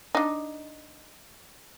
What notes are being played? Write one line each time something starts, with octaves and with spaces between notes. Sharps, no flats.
D4 D#4